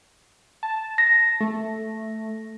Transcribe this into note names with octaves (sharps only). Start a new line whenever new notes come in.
A5
A#6
A3